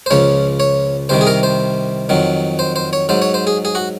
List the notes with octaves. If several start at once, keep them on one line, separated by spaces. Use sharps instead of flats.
C5
C#2 C#3 F3 C#5
C#5
C2 C3 D#3 C5
G#4
A#4
C5
F2 D#3 F#3
C5
C5
C#5
G#2 F#3 C5
C#5
C5
G#4
G#4
F#4